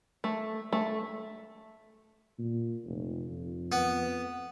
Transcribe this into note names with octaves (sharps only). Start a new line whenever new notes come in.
A3
A3
A#2
F1
F2
B3